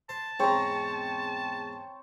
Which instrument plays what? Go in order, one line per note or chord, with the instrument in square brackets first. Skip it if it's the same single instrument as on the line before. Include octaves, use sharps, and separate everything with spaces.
[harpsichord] C5 [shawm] A5
[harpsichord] E2 G#2 G#3 [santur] C4 [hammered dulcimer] C#5 A#5